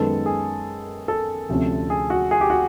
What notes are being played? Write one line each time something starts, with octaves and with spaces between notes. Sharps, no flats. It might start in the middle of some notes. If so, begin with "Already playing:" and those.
Already playing: F#2 D#3 G#3 B3 A4
G#4
A4
D2 C3 F3 A3 C#4
G#4
F#4
G#4
G4
F#4